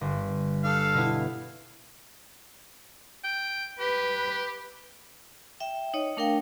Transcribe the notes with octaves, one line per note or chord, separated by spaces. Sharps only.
G1
D4 A4 F5
B2 B3 E4
G5
G4 B4
E5 G5
D#4 C#5 D#5
A3 D4 A#4 F5 G5